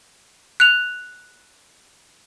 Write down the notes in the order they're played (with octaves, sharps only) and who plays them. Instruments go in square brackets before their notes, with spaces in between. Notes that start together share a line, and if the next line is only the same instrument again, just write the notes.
[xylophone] F#6 F7